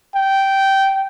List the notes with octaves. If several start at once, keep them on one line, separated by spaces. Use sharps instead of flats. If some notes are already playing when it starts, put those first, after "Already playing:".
G5